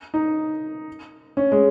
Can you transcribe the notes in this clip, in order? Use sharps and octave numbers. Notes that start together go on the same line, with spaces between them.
D#4
C#4
G#3